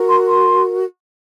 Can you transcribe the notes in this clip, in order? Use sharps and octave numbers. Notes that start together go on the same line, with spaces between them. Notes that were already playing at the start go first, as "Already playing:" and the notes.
Already playing: F#4 A#4
C6
C6